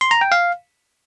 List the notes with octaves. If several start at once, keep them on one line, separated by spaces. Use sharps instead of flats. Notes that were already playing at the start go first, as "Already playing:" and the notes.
C6
A#5
G5
F5